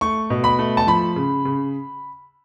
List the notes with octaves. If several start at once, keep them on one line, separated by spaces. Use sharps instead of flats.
A3 C#6
B2
B5
A3
A5
F3 B5
C#3
C#3